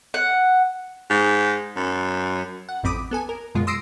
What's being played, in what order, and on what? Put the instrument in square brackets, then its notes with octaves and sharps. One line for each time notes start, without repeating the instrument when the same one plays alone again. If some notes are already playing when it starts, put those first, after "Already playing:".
[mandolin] F#5
[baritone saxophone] G#2
F#2
[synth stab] F#5
A1 F2 C4 B5 D6 D#6
B3 A4 G#5
A#4
F#2 B2 G#3 F4
C6 D#6 E6 A#6 C7 D7